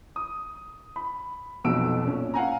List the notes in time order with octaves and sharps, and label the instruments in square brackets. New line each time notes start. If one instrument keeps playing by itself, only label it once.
[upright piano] D#6
B5
B1 F2 B2 E6 D7
A#2 C#4
F5 F#5 G#5 A#5